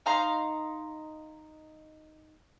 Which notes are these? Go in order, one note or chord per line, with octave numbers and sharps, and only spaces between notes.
D#4 F5 A#5 C6